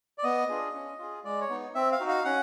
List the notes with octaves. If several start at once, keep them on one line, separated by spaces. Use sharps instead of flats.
D5
B3 D#5
D4 F4 G#4
C#4
F4 G#4
G#3 D5
C#5
B3 D#4
C4 E5
F5
D#4 F#4
F5
C#4 F#5